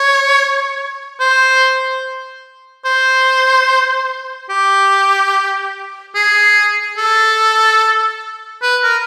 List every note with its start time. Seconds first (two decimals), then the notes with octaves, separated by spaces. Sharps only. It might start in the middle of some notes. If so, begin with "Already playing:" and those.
Already playing: C#5
1.20 C5
2.85 C5
4.50 G4
6.15 G#4
6.98 A4
8.62 B4
8.83 A#4